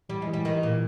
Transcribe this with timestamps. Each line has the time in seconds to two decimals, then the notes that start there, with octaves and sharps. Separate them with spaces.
0.09 E3 G3
0.22 G#3
0.27 E3
0.33 G3
0.45 D#3 E3
0.63 A#2 E3